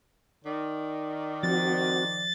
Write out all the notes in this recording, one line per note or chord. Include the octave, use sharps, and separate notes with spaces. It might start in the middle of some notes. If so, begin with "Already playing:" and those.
D#3 D5
F3 C4 F#4 A6